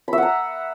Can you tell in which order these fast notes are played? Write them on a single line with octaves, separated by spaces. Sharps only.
B5 E5 F#5 A#5